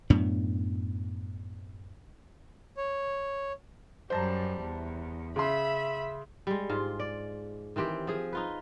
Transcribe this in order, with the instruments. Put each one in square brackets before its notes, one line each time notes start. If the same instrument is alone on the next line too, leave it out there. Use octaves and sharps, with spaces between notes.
[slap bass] F#2 A2 B3 D4
[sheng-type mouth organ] C#5
[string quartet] F#2 G3 [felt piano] C5 A5 A#5
[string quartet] E2
[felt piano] C#3 C6 [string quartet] E5 B5
[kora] G3 G#3
G#2 F4
D5
D#3 E3 C4 G4
F3 G#4
D#4 F4 B4